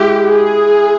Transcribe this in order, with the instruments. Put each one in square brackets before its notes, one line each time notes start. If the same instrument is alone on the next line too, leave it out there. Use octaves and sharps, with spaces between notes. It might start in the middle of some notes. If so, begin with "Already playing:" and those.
Already playing: [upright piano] G#3 E4 [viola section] G4
[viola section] G#4